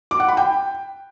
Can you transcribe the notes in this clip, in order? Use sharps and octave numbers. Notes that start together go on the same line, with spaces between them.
D6
F#5
B5
G5